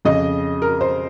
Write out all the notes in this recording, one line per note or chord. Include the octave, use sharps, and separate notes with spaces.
F2 C#3 D#5
A#4
C5